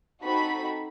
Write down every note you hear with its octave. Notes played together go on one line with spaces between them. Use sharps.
C4 D#4 F#4 A4 B5